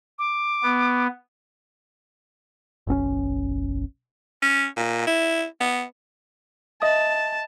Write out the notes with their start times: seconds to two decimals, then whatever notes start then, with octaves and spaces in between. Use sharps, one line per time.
0.19 D6
0.63 B3
2.87 F#1 B1 C4 C#4
4.42 C#4
4.77 A#2
5.07 E4
5.61 B3
6.82 D#5 E5 A5 D#6